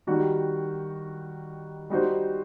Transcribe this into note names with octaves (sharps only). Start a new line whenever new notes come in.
D#3 G3 D#4 F#4
G3 D#4 F#4 C5